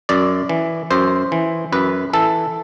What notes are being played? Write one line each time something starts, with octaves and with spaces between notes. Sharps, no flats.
F#2 D5
E3
F#2 C5
E3
F#2 B4
E3 A4